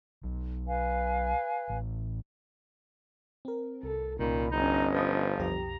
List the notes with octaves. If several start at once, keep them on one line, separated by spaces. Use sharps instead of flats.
B1 F#3
B4 F5 G#5
A1
C4 A#4
C2 A4
C2 A#2 D#3 C#4 B5
G1 C#4 D#4 D#5
F3 B4 F5 D#6
B1 F2 G4 A#5